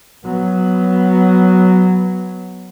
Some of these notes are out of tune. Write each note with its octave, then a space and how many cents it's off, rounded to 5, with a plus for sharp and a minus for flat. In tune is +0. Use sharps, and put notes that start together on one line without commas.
F#3 +0 B3 +0